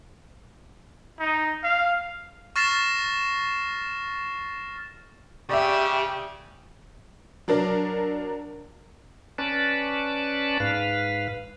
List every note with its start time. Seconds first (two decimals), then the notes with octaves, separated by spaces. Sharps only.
1.20 D#4
1.64 F5
2.56 C#6 F6 A6 A#6 C7 E7
5.49 C#3 G4 D5 E5
7.48 F#3 D4 A#4 D5
9.38 C#4 B4 D5 A5
10.60 G#2 B4 F5